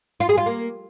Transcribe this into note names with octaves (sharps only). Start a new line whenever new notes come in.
F4
G#4
F4
A#3